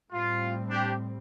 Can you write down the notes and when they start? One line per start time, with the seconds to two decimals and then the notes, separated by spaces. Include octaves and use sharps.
0.12 A2 G3 C4 F4
0.70 D4 G4